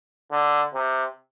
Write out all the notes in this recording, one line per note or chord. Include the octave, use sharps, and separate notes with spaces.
D3
C3